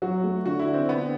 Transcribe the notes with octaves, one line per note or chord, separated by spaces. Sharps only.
F#3 F#4
A3
D3 F#4
E4
D4
C4
D3 B3